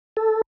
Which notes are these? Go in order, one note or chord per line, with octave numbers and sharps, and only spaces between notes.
A4